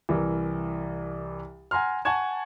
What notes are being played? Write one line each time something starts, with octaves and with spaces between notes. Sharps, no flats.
C2 E3 A#4
F#5 G#5 A#5 C6 F6
F#5 G#5 A5 C#6 G#6 E7